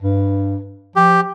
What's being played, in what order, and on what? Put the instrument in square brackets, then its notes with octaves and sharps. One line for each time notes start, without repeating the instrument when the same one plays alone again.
[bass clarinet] G2
[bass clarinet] F3 [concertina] G4